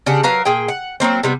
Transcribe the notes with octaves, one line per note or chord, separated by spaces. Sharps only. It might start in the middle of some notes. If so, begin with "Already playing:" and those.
C#3 D4 G4 F#5
F#3 A#4 B4 F5
A#2 G#4 G5
F#5
F#3 G#3 A#3 C4
C3 G3 B3